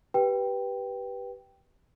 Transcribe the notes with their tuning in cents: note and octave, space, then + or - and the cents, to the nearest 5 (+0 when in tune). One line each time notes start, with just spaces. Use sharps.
G4 -10 B4 -10 G5 +0